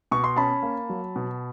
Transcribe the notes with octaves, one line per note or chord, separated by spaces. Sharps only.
B2 C#6
C6
C#4 A5 B5
A#3
F#3
B2